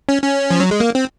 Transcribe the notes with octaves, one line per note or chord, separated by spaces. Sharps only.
C#4
C#4
F3
F#3
G#3
A#3
C4